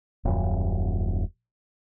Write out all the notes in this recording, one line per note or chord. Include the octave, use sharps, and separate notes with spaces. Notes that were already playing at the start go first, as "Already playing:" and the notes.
D#1 F#2